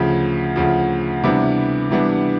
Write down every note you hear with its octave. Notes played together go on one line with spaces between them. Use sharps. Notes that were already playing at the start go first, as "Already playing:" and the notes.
Already playing: D2 C#3 F3
D2 C#3 F3
C3 E3 G3 B3 D4
C3 E3 G3 B3 D4